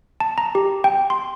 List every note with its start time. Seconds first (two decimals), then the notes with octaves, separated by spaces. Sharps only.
0.20 A5
0.38 A#5
0.55 G4
0.84 G5
1.10 C6